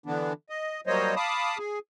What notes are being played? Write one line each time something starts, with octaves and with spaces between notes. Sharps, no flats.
D3 E3 B3 D4
D#5
F#3 G3 A#3 C5 C#5 D#5
F5 A5 B5 D6 D#6
G#4